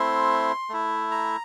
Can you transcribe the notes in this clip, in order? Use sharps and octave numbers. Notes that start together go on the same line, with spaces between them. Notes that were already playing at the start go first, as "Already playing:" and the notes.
Already playing: A3 C4 E4 C6
A3 E4
A#5